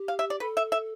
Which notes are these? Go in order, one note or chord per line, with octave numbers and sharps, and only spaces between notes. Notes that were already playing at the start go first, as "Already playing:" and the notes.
Already playing: G4
F5
E5
D5
A4 B4
E5
E5